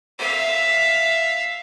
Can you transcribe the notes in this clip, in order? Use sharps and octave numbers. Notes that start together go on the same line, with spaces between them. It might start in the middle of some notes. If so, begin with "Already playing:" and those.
E5 F5